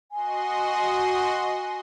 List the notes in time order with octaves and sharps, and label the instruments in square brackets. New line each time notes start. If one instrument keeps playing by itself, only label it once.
[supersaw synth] F#4 D#5 C6 [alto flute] G#5